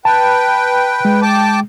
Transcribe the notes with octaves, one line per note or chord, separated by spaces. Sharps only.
B4 G5 A5
G#3
G5 A5 D6